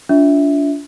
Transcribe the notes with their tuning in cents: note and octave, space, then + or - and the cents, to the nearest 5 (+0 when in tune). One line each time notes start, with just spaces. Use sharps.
D4 -35 F4 +0 E5 -10